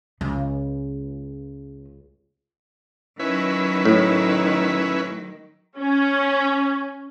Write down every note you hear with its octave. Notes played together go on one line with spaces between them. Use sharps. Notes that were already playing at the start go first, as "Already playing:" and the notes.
C#2 C#3
D#3 F#3 C#4 E4 B4
A2
C#4